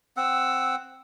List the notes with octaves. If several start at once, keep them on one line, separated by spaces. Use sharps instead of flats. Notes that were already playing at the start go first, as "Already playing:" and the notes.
C4 F#5 E6